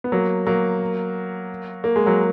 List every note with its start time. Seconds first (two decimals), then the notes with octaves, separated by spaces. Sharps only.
0.04 B3
0.12 F#3 A#3
0.47 F#3 A#3
1.84 A#3
1.96 G#3
2.06 F#3 A#3